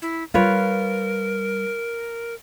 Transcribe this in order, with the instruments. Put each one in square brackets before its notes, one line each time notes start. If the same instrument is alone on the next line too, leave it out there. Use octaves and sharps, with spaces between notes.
[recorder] E4
[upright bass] G3 [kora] F4 B4 C#5 [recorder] A#4